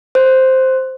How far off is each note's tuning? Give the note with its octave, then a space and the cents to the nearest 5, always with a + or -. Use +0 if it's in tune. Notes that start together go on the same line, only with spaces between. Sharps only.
C5 +0